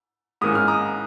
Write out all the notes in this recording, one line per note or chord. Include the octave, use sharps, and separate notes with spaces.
G#2 D#3 A#3 C#4 D#6
F6
A#5 D#6